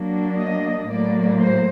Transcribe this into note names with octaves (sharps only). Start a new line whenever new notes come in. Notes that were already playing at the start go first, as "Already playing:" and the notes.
Already playing: F#3 A#3 D4
D#5
A2 F#3 A#3 D5
C5